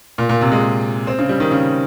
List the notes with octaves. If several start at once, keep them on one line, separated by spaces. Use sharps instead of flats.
A#2
A#2
C3
G#3
C4
C#3
G3
D#3
C#3